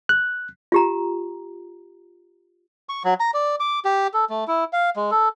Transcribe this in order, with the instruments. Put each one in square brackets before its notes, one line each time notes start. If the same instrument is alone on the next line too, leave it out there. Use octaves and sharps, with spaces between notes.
[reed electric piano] F#6
[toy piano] F4 G4 A#5
[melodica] C#6
F#3
A#5
D5
D6
G4
A4
A3
E4
F5
G#3
A4